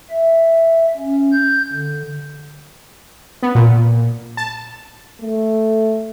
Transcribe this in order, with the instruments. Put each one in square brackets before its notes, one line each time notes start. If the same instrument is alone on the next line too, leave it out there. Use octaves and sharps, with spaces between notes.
[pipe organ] E5
C#4
G6
D3
[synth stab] B3
A#2
A5
[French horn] A3